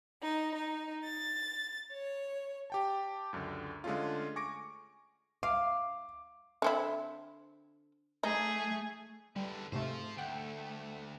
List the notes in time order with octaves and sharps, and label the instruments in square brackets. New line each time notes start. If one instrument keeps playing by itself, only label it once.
[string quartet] D#4
D#4
A6
C#5
[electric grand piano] G4 G5 A5
C#2 F#2 D3
D3 G#3 A3 C#4 F4
G#5 C#6 D6 A#6 C#7 D7
[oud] F5 [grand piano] D6
[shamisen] D3 C4 E4
[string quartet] A3 G#4 [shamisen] D#4
[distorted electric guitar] E2 D3 [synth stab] G3
[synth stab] G#2 C3 A3 [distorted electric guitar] F4 C5
[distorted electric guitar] D2 [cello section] A3 [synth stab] F#5 G5